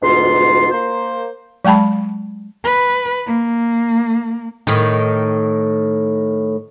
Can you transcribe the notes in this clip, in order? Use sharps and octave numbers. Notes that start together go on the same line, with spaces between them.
D2 G#2 B2 F4 C6
A#3 C5
F#3 G#3 G5 A5 B5
B4
A#3
A2 D#3